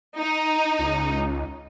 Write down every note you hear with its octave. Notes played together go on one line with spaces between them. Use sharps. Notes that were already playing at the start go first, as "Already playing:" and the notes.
D#4
C#2